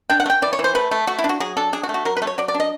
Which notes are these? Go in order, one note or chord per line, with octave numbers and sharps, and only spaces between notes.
D4 G5
F#5
A3
G5
E3 D5
C#5
E3
C5
A3 B4
A3
A3 F#4
E4
D4
F#4
F#3 G#4
D4 A4
D4 G#4
F#4
A3
F#4
F#3 A#4
B4
A3
C#5
F#3 D5
D5
D4
D#5